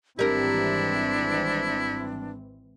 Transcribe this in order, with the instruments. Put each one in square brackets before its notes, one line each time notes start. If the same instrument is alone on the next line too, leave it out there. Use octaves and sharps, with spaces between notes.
[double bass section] G#1 E3 C4 [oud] G3 A#4 [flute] D4 [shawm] E4